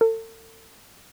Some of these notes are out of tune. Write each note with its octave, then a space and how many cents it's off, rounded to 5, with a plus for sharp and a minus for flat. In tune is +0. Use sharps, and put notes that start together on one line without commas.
A4 +40